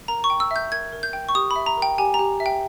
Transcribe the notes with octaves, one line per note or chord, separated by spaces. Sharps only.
A#4 A#5
C#6
G5
E6
E5 G6
A#4 G#6
A#4
G6
G5
C#6
G4 D#6
B5
E5
A#5
A#4
G5
G4 G#5
A#5
G4
E5
G5